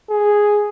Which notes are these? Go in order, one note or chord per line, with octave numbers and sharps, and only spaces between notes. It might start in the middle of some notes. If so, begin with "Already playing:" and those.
G#4